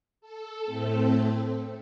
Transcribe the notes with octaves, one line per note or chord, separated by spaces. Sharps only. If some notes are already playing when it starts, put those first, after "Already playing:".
A4
A2 A3 C4